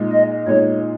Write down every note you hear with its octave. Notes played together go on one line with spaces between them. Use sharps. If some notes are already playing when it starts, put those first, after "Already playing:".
Already playing: A#2 G#3 D#4
D#5
A#2 G#3 D#4 C#5